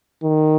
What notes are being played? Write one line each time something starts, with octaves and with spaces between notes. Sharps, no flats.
D#3